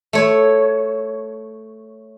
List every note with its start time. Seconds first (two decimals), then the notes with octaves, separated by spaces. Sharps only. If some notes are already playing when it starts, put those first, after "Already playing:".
0.13 A3 C#5